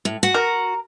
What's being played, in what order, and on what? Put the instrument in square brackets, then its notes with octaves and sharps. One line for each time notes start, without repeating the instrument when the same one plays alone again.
[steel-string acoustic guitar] A2
F#4 F#5
[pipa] A#4